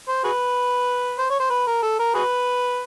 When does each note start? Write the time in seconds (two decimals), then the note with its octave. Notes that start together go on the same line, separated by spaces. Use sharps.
0.08 C5
0.24 F#4 G#4 B4
1.19 C5
1.30 C#5
1.40 C5
1.51 B4
1.67 A#4
1.83 A4
1.99 A#4
2.14 F#4 G#4 B4